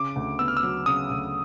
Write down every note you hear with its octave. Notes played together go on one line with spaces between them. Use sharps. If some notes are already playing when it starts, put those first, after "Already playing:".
Already playing: C#3 D6
D2
B3 E6
F6
E6
F#3
C#3 D#6
D2